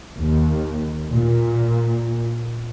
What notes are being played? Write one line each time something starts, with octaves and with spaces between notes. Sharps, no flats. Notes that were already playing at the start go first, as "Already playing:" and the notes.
D#2
A#2